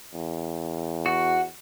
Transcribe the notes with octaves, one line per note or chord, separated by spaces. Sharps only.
E2
F#4